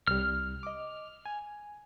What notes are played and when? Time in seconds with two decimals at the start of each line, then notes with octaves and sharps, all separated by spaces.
0.07 C2 G3 F6
0.63 D#5 D6
1.26 G#5